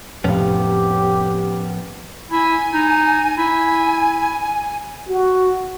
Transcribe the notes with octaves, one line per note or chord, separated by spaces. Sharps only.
F1 A2 F3 B3 C#4 G4 F5
E4 G#5
D#4
E4 G#5
F#4